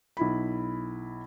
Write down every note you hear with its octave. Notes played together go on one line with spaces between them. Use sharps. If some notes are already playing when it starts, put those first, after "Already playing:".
B1 E4 B5